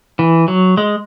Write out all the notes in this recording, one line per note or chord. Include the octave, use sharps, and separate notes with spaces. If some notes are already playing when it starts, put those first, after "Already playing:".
E3
F#3
G#3